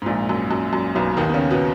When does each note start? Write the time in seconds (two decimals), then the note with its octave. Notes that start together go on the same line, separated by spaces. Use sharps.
0.02 G#2
0.06 A#1 A#2
0.29 F#2
0.51 F#2
0.73 F#2
0.95 B1 B2
1.17 D#2 D#3
1.29 B3
1.34 C#3 C#4
1.50 B2 B3